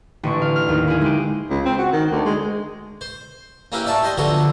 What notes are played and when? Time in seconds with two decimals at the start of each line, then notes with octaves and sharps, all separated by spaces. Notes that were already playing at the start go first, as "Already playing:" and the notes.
0.23 A1 D3 C#6
0.42 F5
0.56 F6
0.69 D#2
0.88 E4 G#4
1.02 G#3 G4
1.50 C#2
1.65 C4
1.78 F#4
1.93 D#3
2.12 D2
2.25 G#3
3.01 C5
3.72 A#3 C#4 E4 G4 B4
3.86 D5 E5 A5 C#6
4.02 G4 C5 D#5 G#5
4.18 D3 F3 F#3 B3 F#4 A4